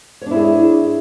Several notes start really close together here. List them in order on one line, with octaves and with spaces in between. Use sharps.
C#5 D4 E4 G#4